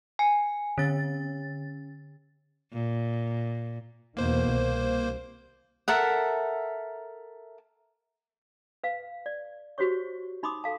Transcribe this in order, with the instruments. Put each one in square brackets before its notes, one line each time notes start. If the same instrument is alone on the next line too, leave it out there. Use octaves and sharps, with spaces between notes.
[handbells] G#5 C#7
[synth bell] D3 A6 [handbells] C#4
[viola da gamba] A#2
[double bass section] E2 B2 D#3 [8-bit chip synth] A#3 C5
[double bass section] C2
[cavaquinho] A4 A#4 E5 F#5
[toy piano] B4 F5
D5
F#4 G4 C5 C#5 C#6
D#4 B5 C6 D6 D#6
A4 F5 A5